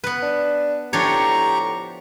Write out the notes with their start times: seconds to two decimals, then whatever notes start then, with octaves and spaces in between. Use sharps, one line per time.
0.04 B3 B4
0.23 D4
0.93 A2 F3 D4 G4 C#5 A#5 C#6